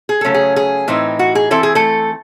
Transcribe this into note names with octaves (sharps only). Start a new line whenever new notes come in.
G#4
C#3 F#3 A3 C#4 A4
G#4
G#4
A2 E3 C4 D#4
F#4
G#4
E3 C4 E4 A4
G#4
A3 A4